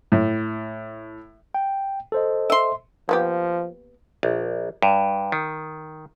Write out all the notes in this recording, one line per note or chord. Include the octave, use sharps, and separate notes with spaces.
A2
G5
A4 C5 D#5
E5 C6
F3 A#3 B3 G4
A#1
G2
D#3